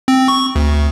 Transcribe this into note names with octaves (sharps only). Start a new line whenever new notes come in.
C4
C#6
D2